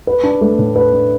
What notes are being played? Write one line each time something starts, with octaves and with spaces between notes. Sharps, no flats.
B4
D4
A3
A2
B4
D4